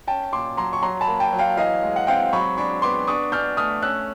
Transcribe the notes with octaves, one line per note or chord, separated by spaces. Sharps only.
C#4 G5 A5
A#2 C6 D6
F#3 A#5 C6
C#6
F#3 A#5 C6
A5 B5
A#3
G5 A5
F#3
F5 G5
E3 D#5 F5
G#3
F#5
C4 F5 G5
F#3 B5 C#6
D4 B5 C#6
B3 C6 D6
D4 C#6 D#6
D4 F6 G6
A3 D#6 F6
C#4 E6 F#6